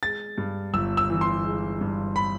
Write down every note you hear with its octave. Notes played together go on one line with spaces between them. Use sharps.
G#3 A6
G2
G1 E6
E6
E3
C6
G#3
G2
B5